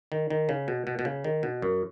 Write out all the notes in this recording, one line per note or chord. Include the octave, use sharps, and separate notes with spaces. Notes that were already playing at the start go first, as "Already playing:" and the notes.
D#3
D#3
C#3
B2
B2
B2
C#3
D#3
B2
F#2